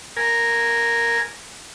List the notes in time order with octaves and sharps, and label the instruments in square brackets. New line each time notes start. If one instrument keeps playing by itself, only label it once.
[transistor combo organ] A#4 G#5